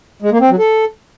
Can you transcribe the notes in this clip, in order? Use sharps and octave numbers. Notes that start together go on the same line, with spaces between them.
G#3
A#3
C4
F#3
A4